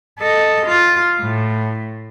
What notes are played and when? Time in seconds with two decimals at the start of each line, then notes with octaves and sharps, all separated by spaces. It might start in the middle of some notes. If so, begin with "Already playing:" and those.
0.19 A4 D#5
0.66 F4
1.20 A2